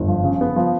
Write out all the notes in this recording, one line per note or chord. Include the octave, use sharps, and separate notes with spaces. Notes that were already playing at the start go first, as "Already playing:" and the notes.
Already playing: G1
F3
C#3
B3
F3